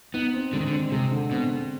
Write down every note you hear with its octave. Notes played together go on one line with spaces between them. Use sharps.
B3 D#4
C4
D3 G#3
D#3
D3
C4
C3 G#3
D3
B2 C4
C4